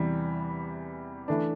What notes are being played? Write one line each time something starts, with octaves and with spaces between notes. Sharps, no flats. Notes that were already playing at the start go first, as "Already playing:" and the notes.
Already playing: E2 C3 E3 G3
E3 A3 D4